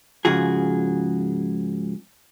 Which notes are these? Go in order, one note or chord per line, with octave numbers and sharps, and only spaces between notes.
G#2 C#3 F3 F#4 G#4